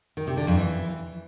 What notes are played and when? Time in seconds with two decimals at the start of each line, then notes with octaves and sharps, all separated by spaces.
0.17 D#3
0.27 C3
0.37 D3
0.47 F2
0.57 E3